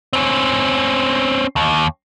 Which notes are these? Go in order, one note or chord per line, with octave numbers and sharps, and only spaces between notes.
C4 C#4
D#2